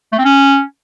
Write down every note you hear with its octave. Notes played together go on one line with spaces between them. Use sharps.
A3
C4
C#4